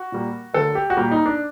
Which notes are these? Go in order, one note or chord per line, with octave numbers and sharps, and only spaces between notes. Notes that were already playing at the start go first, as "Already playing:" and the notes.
Already playing: F#4
A#2 G3 A#3
D3 F#3 A3 A4
G4
F#4
A#2 G3 A#3 G4
D#4
D4